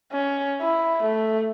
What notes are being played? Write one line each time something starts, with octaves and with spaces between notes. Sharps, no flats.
C#4
E4
A3